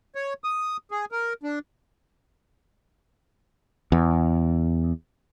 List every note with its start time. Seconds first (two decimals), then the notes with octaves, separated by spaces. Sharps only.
0.15 C#5
0.44 D#6
0.91 G#4
1.12 A#4
1.43 D4
3.92 E2